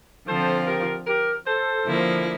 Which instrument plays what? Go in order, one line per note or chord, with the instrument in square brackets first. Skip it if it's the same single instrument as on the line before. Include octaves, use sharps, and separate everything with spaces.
[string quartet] D3 F3 C4 F4 [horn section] A4 C5
[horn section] G4 A#4
G4 A#4
A4 C5
[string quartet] D3 F3 A#3 E4